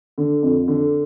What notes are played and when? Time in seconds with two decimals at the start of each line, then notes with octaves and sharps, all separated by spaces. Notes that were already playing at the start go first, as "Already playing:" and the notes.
0.18 D3
0.43 F2
0.68 D3